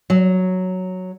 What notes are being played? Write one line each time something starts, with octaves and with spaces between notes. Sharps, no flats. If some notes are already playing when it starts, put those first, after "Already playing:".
F#3